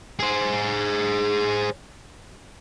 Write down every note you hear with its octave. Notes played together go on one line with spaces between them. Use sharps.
G#4 C5